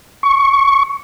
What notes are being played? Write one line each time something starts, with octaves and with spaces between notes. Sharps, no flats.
C#6